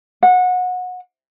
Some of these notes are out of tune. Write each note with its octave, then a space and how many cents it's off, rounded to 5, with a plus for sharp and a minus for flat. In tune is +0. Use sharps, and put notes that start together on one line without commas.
F#5 -25